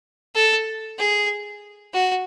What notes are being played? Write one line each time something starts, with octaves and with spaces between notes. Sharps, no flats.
A4
G#4
F#4